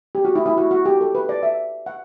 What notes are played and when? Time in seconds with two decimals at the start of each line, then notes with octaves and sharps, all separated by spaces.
0.15 G4
0.25 F#4
0.36 E4
0.46 E4
0.57 F#4
0.71 F#4
0.86 G4
1.01 A4
1.15 B4
1.29 D5
1.43 E5
1.86 F#5